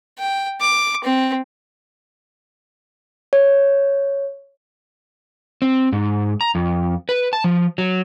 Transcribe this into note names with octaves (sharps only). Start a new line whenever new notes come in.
G5
D6
C4
C#5
C4
G#2
A#5
F2
B4
A5
F3
F#3